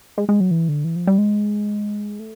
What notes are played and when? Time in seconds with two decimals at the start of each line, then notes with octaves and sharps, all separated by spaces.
0.18 G#3
0.29 G#3
0.40 F#3
0.51 E3
0.69 D3
0.84 E3
0.96 F3
1.07 G3
1.18 G#3
2.19 A3